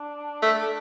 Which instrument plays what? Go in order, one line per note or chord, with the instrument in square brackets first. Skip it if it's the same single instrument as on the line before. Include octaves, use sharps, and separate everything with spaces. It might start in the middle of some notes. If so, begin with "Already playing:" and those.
Already playing: [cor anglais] D4
[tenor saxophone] A3